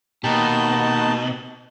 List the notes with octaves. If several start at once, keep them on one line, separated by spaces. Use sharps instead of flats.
B2 A#3 D#4 G4 A5